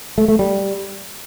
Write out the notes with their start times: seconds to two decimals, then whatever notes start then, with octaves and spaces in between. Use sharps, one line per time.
0.18 A3
0.28 A3
0.39 G3